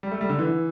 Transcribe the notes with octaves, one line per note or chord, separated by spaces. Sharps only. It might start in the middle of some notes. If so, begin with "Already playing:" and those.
G3
A3
G3
D3
E3